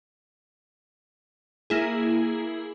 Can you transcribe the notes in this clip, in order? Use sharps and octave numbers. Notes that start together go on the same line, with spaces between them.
A#3 E4 G#4